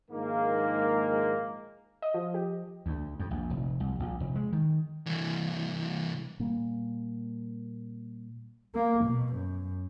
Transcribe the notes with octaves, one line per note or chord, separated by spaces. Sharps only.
A#1 G#2 D#3 G#3 A#3
D#5
F3
G4
D2
F2
A#1
F1
C2
A#1
F1
G#3
D#3
C2 E3
A#2 G3 A#3
A#3
B2
F#2